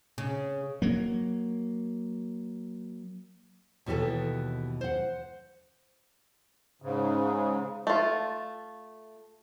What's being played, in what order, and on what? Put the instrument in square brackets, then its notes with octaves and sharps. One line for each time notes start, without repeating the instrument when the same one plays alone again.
[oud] C#3
[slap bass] F#3 A#3
[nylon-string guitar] D#2 B2 E3 G4 A4 B4
C5 F#5
[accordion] G#2 C#3
[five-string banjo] A3 F4